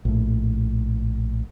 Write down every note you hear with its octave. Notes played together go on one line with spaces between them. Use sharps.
A#1 A2